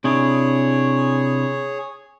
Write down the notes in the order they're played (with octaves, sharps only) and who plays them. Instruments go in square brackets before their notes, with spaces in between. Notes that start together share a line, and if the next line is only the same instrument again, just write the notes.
[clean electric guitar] C3 D4 E4 [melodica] G#4 C#5